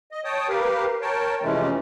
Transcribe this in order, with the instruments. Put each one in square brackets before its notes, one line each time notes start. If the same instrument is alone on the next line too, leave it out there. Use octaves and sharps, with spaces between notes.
[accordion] D#5
C#5 G5 A5 D#6
G4 A#4 B4 F5
A#4 C#5 G5 A5
F2 C3 E3 G#3 A3 C#4